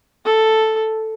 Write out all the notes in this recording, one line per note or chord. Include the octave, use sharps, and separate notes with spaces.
A4